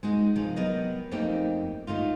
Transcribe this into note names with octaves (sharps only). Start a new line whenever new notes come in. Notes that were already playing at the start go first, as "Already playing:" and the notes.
G#3 D#4 F#4
C3 D#3 F3
F#3 B3 G4 A#4 D#5
F2 A3 A#3 C4 D#4 G4
D#3 A3 D#4 F4